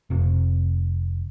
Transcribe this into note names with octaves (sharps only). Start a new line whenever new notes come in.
F1 C3